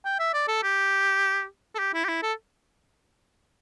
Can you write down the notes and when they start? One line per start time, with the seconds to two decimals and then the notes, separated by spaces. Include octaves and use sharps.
0.05 G5
0.19 E5
0.34 D5
0.48 A4
0.63 G4
1.75 A4
1.79 G4
1.94 E4
2.04 G4
2.09 E4
2.22 A4